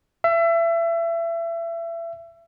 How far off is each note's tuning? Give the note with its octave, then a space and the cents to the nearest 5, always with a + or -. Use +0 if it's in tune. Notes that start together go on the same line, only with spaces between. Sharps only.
E5 +30